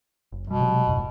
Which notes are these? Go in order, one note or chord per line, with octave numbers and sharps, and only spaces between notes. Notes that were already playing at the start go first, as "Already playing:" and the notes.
F#1
F#2 B2 G3
C3 F#3 G#3
D#1 F#2 A2